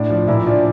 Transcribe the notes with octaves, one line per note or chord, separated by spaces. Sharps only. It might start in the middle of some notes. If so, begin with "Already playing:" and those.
Already playing: A2 D4
F3
A#2 E4
F3 D4